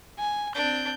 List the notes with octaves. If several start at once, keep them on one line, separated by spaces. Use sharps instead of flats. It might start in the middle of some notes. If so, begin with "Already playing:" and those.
G#5
C4 D4 G6